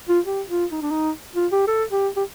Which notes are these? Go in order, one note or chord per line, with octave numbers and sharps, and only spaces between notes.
F4
G4
F4
D#4
D4
D#4
F4
G4
A4
G4
G4